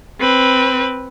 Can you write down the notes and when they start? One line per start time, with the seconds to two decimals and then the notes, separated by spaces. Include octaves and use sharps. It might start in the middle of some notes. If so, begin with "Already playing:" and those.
0.20 C4 B4